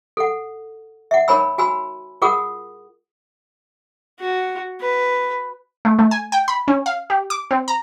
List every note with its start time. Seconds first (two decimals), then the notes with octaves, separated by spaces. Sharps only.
0.17 A4 F#5
1.11 E5 F#5
1.28 D#4 A#4 C#5 G#5 B5 E6
1.58 F#4 G#5 B5 E6
2.22 F4 G#4 A#4 F#5 D#6
4.20 F#4
4.81 B4
5.85 A3
5.99 A3
6.11 G#5
6.32 G5
6.48 B5
6.68 C#4
6.86 F5
7.10 G4
7.30 D6
7.51 C4
7.68 A#5